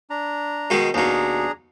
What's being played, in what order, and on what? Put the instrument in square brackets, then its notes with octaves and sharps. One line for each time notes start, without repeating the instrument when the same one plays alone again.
[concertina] D4 A#5
[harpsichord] B2 D#3 G#3
[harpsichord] D#2 B2 [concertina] D4 G#4 A#5